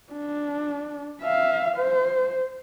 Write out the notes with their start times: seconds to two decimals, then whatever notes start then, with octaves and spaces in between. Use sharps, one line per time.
0.13 D4
1.22 E5 F5
1.77 C5